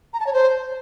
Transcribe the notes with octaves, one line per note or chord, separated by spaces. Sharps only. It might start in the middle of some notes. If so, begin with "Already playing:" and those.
A#5
A5
C#5
C5